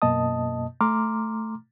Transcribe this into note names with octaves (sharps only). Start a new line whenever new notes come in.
F#2 B2 A#3 D#5 A5 D#6
A3 A#5 C6 D6 F6